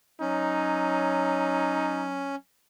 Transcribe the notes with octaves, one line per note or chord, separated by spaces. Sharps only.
F#3 C#4 D#4